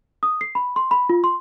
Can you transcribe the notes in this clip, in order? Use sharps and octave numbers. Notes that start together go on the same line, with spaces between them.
D#6
C7
B5
C6
B5
F4
C6